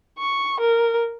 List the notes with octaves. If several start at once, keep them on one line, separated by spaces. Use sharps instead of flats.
C#6
A#4